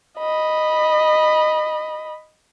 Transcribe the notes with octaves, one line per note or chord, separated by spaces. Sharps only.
D#5 B5